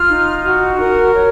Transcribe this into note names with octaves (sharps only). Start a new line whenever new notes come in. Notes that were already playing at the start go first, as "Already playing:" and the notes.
Already playing: F4 F6
D#4
F#4
A#4
C#5